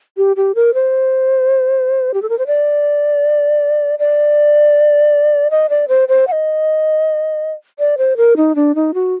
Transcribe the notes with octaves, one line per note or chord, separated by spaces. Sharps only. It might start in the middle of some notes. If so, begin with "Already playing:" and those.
G4
G4
A#4
C5
G4
A4
A#4
C5
D5
D5
D#5
D5
C5
C5
F#5
D#5
D5
C5
A#4
D#4
D4
D#4
F#4